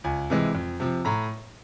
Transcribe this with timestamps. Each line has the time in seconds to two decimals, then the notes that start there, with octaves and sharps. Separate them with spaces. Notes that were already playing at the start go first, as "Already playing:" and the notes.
0.04 C#2 G#5
0.30 C3 E3 G#3
0.55 F2
0.80 C3 F3
1.05 A2 A#5